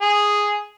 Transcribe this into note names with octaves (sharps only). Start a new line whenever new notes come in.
G#4